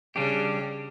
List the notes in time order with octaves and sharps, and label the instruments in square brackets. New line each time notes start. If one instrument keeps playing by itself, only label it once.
[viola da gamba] C#3 [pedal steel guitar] G3 D4 G4